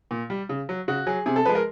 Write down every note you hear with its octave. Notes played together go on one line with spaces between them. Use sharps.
A#2
G3
C#3
F#3
C#3 F#4
F#3 G#4
C3 G#4
A4
F3 G#3 B4
A#4